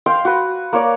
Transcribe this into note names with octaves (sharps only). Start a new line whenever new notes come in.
F5 G5 C6
F#4 B4
A#3 C#5 D5